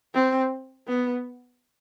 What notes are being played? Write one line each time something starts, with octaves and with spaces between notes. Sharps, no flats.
C4
B3